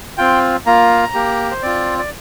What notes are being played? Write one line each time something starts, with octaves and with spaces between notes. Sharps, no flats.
C4 F4 G5
A#3 F4 A#5
A#3 G4
C5
C4 F4 D5
D5